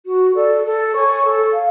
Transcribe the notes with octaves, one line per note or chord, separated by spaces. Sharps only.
F#4
A4 D5
A4
C#5 G#5 C#6
A4
F5